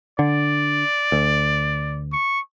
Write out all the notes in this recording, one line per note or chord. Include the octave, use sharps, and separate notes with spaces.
D3 D5
D2
C#6